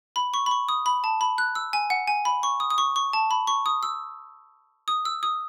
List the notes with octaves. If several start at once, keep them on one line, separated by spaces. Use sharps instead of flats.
B5
C#6
B5
C#6
D#6
B5
A5
B5
F#6
E6
G#5
F#5
G#5
B5
C#6
D#6
D#6
C#6
C#6
A5
B5
C#6
D#6
E6
D#6
E6
D#6